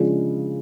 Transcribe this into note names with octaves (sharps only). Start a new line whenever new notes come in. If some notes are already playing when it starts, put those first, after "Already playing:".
Already playing: C#3 F3 G#3 D4 F4